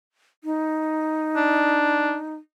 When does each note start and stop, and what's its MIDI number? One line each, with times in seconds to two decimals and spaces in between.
0.44 2.35 63
1.36 2.18 62